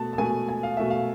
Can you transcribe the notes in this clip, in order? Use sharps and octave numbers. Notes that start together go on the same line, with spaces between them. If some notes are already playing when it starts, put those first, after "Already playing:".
Already playing: B2 A3 A5
A5
B2 A3 G#5
G#5
F5
B2 A3 E5
F5